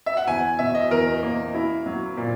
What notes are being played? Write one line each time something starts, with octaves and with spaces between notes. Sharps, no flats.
E5
F#5
E2 G#5
B2 E5
D#5
E2 A#4
A#3
E4
F#3
A#2